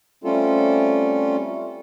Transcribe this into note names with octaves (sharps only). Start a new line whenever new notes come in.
G3 A3 C4 C#4 F4 A4